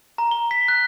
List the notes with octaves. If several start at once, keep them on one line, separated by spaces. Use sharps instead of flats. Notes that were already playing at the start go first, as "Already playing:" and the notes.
A#5
G7
B6
F#6